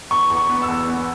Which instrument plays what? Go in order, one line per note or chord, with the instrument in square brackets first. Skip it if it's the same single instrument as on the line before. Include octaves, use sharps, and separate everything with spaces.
[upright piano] E2 [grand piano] C#6
[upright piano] E2
[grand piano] C#6
[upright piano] B3
[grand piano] E6
[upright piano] E2
B3